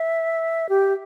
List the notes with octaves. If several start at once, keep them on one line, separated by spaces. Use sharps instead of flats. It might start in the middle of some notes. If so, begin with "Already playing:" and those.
Already playing: E5
G4